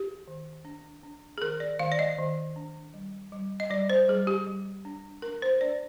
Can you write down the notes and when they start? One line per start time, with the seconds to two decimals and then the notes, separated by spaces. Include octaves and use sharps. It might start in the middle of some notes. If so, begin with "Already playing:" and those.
Already playing: G4
0.28 D#3
0.65 D4
1.03 D4
1.38 G#4
1.42 D#3 A#4
1.60 D5
1.79 D#3 F5
1.92 D5
1.99 D#5
2.18 D#3
2.56 D4
2.94 G3
3.32 G3
3.60 D#5
3.70 G3 D5
3.90 C5
4.08 G3 G#4
4.27 G4
4.47 G3
4.85 D4
5.22 D4 A#4
5.42 C5
5.61 D4 D5